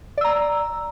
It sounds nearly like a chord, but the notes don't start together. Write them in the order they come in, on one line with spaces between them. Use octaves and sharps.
D5 E6 A#5